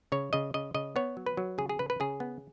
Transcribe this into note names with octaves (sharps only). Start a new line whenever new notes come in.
C#3 C#5
C#3 D#5
C#3 D#5
C#3 D#5
B3 C#5
F#3
B4
F#3
C#3 G#4
G#4
C#3 B4
B4
C#3 G#4
B3